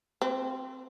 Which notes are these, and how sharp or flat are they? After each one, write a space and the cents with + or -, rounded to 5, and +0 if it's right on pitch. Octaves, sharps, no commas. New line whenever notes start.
C4 +0 B4 +45